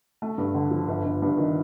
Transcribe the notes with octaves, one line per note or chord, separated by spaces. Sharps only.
A3
G2
D3
F3
G1
G1
G2
D#3